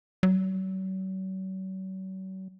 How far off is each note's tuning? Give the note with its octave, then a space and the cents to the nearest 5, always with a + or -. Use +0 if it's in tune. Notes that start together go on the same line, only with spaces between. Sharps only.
F#3 +40